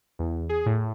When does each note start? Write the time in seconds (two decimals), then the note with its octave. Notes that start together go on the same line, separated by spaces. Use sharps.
0.19 E2
0.49 G#4
0.66 A2